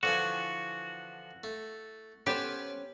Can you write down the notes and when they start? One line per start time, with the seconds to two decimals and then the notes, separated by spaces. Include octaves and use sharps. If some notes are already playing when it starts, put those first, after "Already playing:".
0.03 D3 E3 F3 F#4 G#5
1.44 A3
2.26 B3 C#4 G4 A4 B4 C5